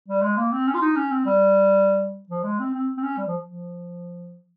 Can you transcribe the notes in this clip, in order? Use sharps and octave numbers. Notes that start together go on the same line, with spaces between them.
G3
G#3
A#3
C4
C#4
F4
D#4
C#4
C4
G3
F3
G#3
C4
C4
C4
C#4
G3
F3
F3